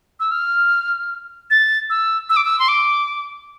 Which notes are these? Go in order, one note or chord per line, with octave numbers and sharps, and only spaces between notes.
E6
F6
A6
E6
E6
D6
E6
C6
D6